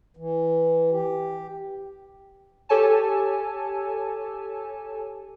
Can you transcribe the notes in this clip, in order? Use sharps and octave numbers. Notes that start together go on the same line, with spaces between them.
E3
G4
G4 A4 C#5 G#5 A5